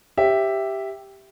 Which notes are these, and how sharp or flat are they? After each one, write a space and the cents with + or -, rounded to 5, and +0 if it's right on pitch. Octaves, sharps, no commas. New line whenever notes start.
G4 +0 C#5 -25 E5 +0